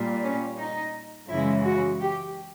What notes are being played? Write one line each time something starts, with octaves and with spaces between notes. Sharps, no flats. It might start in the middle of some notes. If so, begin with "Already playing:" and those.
Already playing: A#2 G3
C#4
D#4
F#2 C#3 E3 G#3 E4
F#4
G4